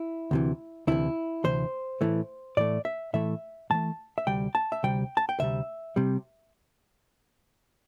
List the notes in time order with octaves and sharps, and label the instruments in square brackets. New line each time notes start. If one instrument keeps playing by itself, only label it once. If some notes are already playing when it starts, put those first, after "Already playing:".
Already playing: [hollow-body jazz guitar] E4
D2 C3 E3
D2 C3 E3 E4
D2 C3 E3 C5
A2 E3 A3
A2 E3 A3 D5
E5
A2 E3 A3 E5
A2 E3 A3 A5
E5
D2 C3 G3 G5
A5
E5
D2 C3 G3 G5
A5
G5
D2 C3 G3 E5
C3 G3